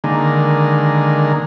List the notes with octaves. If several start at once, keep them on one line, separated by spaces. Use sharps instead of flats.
D3 D#3 G#3 A#3